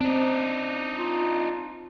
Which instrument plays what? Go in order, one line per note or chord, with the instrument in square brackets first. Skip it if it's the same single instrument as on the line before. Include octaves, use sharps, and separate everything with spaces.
[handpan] C4 [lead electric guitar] D4 D#4
[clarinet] F4